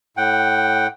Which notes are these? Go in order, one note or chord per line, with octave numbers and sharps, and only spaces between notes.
A2 F#5 G5